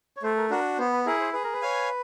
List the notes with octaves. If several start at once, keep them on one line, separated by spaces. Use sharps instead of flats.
C#5
A3 C5
A#4
D4 F#4 A#4
B3 C5
B4
E4 G#4 A#4
C5
G#4 B4
A#4
B4
C#5 F5 G#5